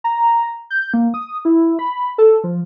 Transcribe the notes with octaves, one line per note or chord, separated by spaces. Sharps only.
A#5
G6
A#3
D#6
E4
B5
A4
F3